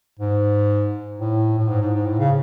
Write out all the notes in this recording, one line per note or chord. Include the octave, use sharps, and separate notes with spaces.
G#2
A2
A2
G#2
G#2
G#2
A2
C#3